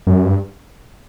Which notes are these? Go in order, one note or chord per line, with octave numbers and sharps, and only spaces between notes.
F#2
G2